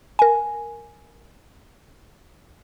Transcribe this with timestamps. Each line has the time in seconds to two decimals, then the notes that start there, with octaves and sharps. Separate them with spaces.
0.19 A#4 G#5